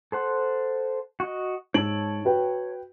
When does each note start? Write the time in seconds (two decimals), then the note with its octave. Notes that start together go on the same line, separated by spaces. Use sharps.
0.12 A4 C5 F#5
1.20 F#4 D#5
1.74 G#2 C#5 A5 E6 D7 F#7
2.25 F#4 B4 G5